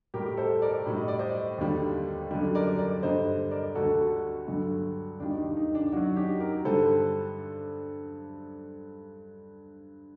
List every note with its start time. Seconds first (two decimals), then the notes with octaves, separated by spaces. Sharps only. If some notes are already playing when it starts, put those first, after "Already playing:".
0.14 A2 G3 G4 A#4
0.37 A4 C5
0.62 A#4 D5
0.86 A2 G3
0.97 D#5
1.08 D5
1.19 C5 D#5
1.58 D#2 D3 G3
2.31 F#2 D3 G3
2.55 A#4 D5
2.79 A#4 D5
3.03 G2 D3 G3 C5 D#5
3.51 A#4 D5
3.75 D2 D3 G3 F#4 A4
4.48 G2 D3 F#3
5.20 D#2 D#3 G3 D4
5.38 D#4
5.56 D#4
5.75 D4
5.92 F#2 F#3 D4 F#4
6.16 D#4 G4
6.40 G4 A#4
6.64 G2 D3 G3 A4 C5